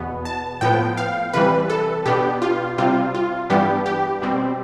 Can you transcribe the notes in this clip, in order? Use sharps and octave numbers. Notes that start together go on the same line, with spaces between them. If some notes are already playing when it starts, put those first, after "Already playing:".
Already playing: E2 B2 B3
A5
A2 F3 B3 G5
F5
C3 E3 G3 B4
A4
B2 B3 D4 G4
F4
C3 G3 C4 F4
F4
G2 E3 G3 B3 D4 G4
G4
B2 G3 C4